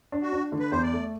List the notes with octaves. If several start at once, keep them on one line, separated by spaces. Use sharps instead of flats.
D4
F#4
D4
D3
B4
E2 C5
D5
A3